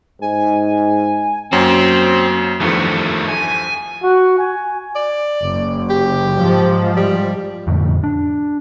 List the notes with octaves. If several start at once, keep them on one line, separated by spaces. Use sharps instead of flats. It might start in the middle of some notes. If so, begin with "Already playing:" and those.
G#2 G#5
F#2 F#3 A#3 C4
E2 G2 D#3 F3 A3
G#5
F#4
G#5
D5
F#1
G4
G#2 F3
G3
F2 A2 D3
D4